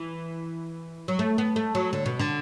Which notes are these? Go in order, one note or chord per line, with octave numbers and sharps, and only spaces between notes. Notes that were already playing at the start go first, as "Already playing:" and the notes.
Already playing: E3
F#3
A3
B3
A3
F#3
D3
B2
D3